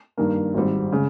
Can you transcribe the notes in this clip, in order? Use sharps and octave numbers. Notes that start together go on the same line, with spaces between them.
G2 D#3 A#3
G#1 G#2 G3 C4
C#3 G#3